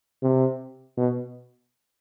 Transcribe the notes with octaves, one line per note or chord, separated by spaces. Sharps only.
C3
B2